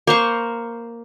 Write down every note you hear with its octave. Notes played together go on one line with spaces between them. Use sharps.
A#3 C5 C#6